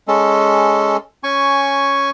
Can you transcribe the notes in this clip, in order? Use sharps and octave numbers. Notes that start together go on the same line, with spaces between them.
G#3 C#4 A4
C#4 G#5 C#6